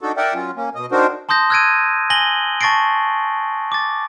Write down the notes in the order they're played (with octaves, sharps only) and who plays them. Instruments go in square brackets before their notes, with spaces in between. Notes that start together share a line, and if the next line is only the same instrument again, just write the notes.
[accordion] D4 D#4 F#4 A4
A#4 D5 E5 F#5 G5
F#3 C#4 F4
A#3 C#4
B2 D#5
C4 D4 D#4 F#4 A#4 C5
[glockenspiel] A5 C6 D#6 G6 A#6
E6 F#6 G#6 A#6 D7 D#7
G#5 A#6 F#7 G7
A5 C#6 A6 A#6 C7 D7
D6 A6